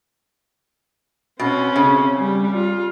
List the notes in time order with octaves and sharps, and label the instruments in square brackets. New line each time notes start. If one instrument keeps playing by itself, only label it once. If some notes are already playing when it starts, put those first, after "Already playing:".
[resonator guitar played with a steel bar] B2 [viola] C4 C#4
[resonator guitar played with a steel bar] C#3
[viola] G3
F4